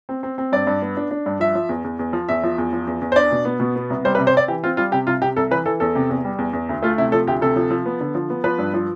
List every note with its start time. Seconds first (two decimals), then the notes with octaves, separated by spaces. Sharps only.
0.09 C4
0.23 C4
0.38 C4
0.52 G2 D5
0.67 G2
0.82 B3
0.97 D4
1.11 D4
1.26 G2
1.40 F3 E5
1.55 F3
1.69 E2
1.84 E2
1.99 E2
2.13 F3
2.29 E2 E5
2.44 F3
2.58 E2
2.73 F3
2.87 E2
3.02 E2
3.12 C5
3.16 D4 D5
3.31 B2
3.45 B3
3.60 B2
3.76 B3
3.90 C2
4.05 G3 C5
4.15 B4
4.18 C3
4.27 C5
4.34 C4 D5
4.48 E3 G4
4.64 C4 F4
4.77 G3 F4
4.92 C3 G4
5.07 C2 F4
5.22 C3 G4
5.36 C2 A4
5.51 E3 B4
5.66 E3 A4
5.80 E2 A4
5.95 C3
6.10 E2
6.25 G3
6.38 E2
6.53 E2
6.69 D2
6.82 A3 F4
6.98 C3 E4
7.12 F3 A4
7.27 D2 G4
7.41 C3 A4
7.56 F3
7.71 F3
7.86 B3
8.01 D3
8.15 F3
8.30 B3
8.44 F3 B4
8.59 G2
8.74 F3